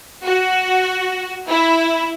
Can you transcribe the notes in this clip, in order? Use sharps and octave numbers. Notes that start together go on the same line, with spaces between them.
F#4
E4